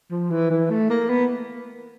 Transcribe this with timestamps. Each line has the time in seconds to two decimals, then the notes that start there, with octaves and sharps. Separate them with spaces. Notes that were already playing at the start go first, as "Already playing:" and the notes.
0.11 F3
0.31 E3
0.50 E3
0.70 A3
0.90 A#3
1.10 B3